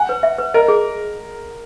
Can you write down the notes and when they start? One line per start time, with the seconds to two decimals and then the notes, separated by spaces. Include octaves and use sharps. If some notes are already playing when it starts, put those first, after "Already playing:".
Already playing: F#5 G#5
0.09 B4
0.23 E5
0.38 B4
0.54 A#4 D#5
0.68 G#4